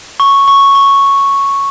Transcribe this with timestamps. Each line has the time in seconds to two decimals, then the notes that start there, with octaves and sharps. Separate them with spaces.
0.20 C#6
0.48 C#6
0.75 C#6